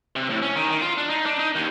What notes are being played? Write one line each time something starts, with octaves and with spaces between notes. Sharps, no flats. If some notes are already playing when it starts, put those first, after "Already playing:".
C3
A2
C#4
D#3
D#3
F4
D4
D#4
D4
D#4
D#2